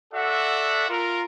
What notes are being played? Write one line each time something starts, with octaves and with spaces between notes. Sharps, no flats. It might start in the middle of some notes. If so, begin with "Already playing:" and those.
F#4 A4 D5 E5 F#5
F4 A#4